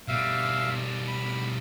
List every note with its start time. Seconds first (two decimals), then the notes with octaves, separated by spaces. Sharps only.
0.08 B2 G3 E5 F5
1.08 B5